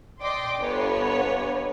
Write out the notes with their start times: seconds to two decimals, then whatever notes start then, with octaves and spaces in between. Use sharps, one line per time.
0.20 D5 D#5 G5 C6 D6
0.59 G1 B3 B4 C#5